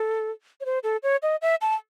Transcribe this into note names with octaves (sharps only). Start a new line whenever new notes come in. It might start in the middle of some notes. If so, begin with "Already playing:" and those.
Already playing: A4
C#5
C5
A4
C#5
D#5
E5
A5